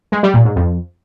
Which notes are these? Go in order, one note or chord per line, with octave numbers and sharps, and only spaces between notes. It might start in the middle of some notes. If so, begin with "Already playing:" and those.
G#3
G3
A#2
G#2
F2